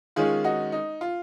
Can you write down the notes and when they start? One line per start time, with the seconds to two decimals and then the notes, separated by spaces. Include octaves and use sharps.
0.16 D#3 G#3 C#4 F4 G#4
0.44 D#4 F#4
0.72 D#4
1.01 F4